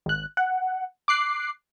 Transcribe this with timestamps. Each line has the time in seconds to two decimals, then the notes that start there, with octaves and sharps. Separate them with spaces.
0.06 G#1 F#6
0.37 F#5
1.08 D6 F#6 C7